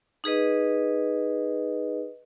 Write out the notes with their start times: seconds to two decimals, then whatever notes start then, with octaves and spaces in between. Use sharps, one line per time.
0.24 D#4 G#4 B4 D#5